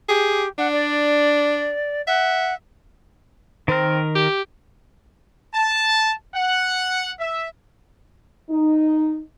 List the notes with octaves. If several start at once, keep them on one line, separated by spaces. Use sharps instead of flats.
G4 G#4
D4 F#5
D5
E5 F#5
D#3 C4 A#4
G4
A5
F#5
E5
D#4